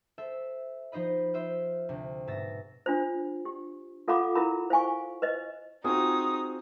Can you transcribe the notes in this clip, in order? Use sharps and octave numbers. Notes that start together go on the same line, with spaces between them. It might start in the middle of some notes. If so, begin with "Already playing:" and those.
A4 C5 E5
F3 D#4 C5 D#5 B5
F4 C5 E5
D2 C3
G#2 B2 E5 A6 A#6
D4 F4 C5
G4
F4 A4 F5 F#5 B5 D6
E4 A#4 B5
C5 F5 G#5 C#6
B4 C5 D#5
C4 D#4 F4 F#4 G#4 D#6